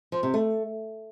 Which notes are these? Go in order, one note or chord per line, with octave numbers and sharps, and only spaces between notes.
F3
C3
A3